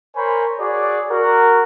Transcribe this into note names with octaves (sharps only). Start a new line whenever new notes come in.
A#4 C5 C#5 G#5 B5
F#4 G#4 C#5 D5
F#4 A#4